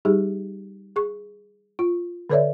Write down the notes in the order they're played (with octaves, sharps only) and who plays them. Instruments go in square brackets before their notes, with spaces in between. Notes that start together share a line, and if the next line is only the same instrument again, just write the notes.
[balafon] G3 D#4 G4 G#4
G#4 C#6
F4
D3 A4 B4 C#5 D5 E5